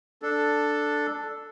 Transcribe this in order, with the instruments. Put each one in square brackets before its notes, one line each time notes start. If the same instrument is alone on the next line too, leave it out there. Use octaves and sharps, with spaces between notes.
[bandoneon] D4 A4